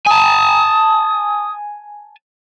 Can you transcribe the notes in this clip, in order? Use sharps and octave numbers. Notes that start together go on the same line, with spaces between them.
G#5 A5 D#6